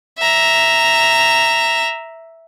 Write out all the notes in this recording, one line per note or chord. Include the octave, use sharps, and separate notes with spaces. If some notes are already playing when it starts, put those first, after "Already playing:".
E5 A#5